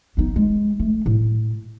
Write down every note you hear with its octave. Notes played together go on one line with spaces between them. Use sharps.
B3 D#4
G#3
A3
A2